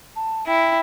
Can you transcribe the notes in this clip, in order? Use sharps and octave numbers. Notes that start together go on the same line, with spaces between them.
A5
E4 G5